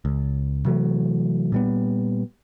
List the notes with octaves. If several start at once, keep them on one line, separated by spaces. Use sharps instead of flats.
C#2
C3 E3 F#3 A3
A#2 G3 B3